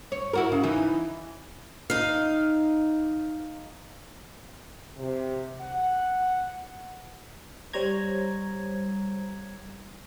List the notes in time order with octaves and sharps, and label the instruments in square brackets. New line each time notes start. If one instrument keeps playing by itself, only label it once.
[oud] C#5
E4 F#4 A#4
C#3
E3 D#4
[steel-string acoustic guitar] D#4 F5
[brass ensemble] C3
F#5
[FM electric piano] G3 C5 C#5 A#5 G#6